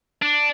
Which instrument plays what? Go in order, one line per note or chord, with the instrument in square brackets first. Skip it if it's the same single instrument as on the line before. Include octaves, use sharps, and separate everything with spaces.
[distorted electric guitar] D4